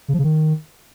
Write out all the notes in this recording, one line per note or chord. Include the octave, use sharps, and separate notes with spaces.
C#3
F3
C#3
D#3